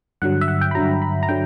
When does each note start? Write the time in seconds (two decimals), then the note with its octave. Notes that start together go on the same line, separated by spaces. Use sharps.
0.22 G2 D3 F#3 F#5
0.41 E5
0.48 F#5
0.61 G5
0.71 B5
0.75 G2 D3 F#3 A#5
1.02 B5
1.23 A#5
1.29 D3 F#3 G5